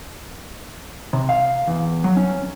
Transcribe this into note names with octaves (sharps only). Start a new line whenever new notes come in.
C3
F5
E2
F#3
C#4